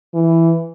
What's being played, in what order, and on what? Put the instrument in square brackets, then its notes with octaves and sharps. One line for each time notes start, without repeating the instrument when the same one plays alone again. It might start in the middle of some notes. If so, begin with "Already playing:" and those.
[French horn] E3